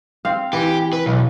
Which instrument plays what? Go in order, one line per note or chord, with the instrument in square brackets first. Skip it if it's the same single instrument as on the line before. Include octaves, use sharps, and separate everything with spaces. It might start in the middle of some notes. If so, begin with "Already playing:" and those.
[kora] C4 F5
[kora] E3 [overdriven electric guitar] G4
[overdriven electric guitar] B4
B1